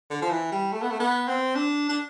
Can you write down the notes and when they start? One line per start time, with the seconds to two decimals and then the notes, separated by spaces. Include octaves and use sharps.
0.10 D3
0.22 F3
0.31 E3
0.52 G3
0.73 A3
0.82 B3
0.91 A3
1.00 B3
1.28 C4
1.55 D4
1.89 D4